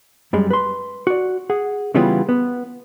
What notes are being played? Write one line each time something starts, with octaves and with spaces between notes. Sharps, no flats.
F#2 G3 G#3
B4 C6
F#4 D5
G#4 F#5
C#3 E3 G3 B3 F4 G#4
B3